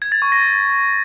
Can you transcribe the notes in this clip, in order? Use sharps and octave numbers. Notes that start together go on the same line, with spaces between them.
G#6
A6
C#6
A#6